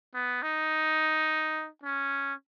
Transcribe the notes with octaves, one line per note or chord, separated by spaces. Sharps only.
B3
D#4
C#4